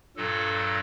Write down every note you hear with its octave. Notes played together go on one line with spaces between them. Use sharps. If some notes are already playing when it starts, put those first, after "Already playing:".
G2 A#2 F#3 A4